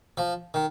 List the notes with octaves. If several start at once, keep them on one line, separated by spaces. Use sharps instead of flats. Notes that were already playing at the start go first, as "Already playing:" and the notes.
F3
D#3